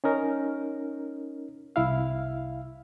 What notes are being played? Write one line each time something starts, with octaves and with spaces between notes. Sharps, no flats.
C#4 D#4 A#4
C2 E4 F5